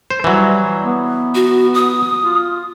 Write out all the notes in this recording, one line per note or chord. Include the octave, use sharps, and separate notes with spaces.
C5
E3 F#3 G3
B3
F#4
D#6
F4